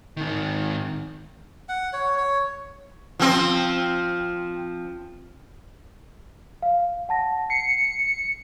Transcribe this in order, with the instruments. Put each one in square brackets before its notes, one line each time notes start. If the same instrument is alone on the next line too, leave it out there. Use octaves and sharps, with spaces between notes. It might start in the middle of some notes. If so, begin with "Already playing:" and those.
[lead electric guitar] G#2 D#3
[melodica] F#5
C#5
C#5
[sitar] F3 C4
[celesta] F5
F#5 A5 A#6
[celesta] C7 [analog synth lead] C#7